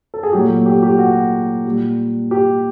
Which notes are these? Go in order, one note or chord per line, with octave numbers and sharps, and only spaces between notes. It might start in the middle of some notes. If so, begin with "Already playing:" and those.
A4
G#4
A#2 F#3 A3 G4
G4
G4
F#4
A#2 G3
G4